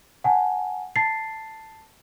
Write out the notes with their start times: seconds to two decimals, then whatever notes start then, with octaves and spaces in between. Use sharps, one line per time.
0.24 F#5 G#5 A5
0.96 A5 A6 C7